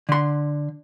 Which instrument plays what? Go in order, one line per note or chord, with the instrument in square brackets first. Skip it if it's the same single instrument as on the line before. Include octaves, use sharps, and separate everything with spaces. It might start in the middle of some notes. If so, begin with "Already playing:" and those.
[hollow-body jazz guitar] D3 C6